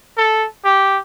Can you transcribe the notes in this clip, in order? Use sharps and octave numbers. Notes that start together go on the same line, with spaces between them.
A4
G4